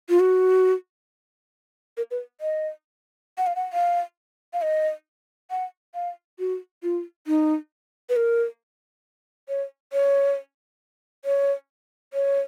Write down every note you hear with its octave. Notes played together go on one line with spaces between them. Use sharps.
F4
F#4
A#4
B4
D#5
F#5
F5
F#5
F5
F5
D#5
F#5
F5
F#4
F4
D#4
B4
A#4
C#5
C#5
C#5
C#5